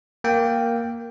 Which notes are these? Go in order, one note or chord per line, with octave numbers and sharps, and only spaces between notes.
A#3 G5